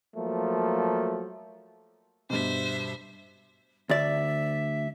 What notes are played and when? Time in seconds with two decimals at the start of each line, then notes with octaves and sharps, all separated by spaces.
0.16 F3 F#3 A3 A#3
2.30 G2 B2 C5 E5
3.89 D2 D5 E5